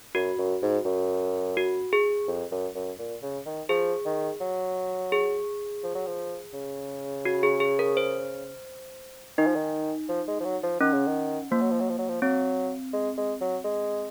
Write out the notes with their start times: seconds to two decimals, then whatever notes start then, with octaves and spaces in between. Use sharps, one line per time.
0.15 F#2 F#4
0.39 F#2
0.62 G#2
0.85 F#2
1.57 F#4
1.93 G#4
2.28 F2
2.52 F#2
2.75 F#2
2.99 A#2
3.23 C#3
3.46 D#3
3.69 F3 G#4
4.05 D#3
4.41 F#3
5.12 G#4
5.84 F3
5.95 F#3
6.07 F3
6.54 C#3
7.25 F#4
7.43 G#4
7.60 G#4
7.79 A#4
7.97 C5
9.38 D#3 D#4
9.47 F3
9.56 D#3
10.09 F3
10.28 G#3
10.41 F3
10.45 F#3
10.63 F3
10.80 D#3 C#4
10.94 C#3
11.07 D#3
11.51 F3 A#3
11.61 F#3
11.71 F3
11.80 F#3
11.90 F3
11.98 F#3
12.09 F3
12.22 F#3 C4
12.93 G#3
13.18 G#3
13.41 F#3
13.64 G#3